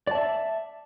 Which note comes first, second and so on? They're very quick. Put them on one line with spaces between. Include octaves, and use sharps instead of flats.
D5 A5 E5